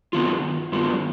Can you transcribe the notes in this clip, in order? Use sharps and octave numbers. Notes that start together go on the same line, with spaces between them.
G2 D#3 F#3 B3 F4
G2 D#3 F#3 B3 F4